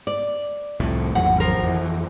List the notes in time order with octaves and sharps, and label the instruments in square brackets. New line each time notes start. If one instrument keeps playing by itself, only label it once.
[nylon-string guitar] D5
[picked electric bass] C2 F2 A2
[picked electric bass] G#1 E2 F#3 [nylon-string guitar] F#5
[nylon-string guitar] F3 A#4
[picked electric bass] F2 E3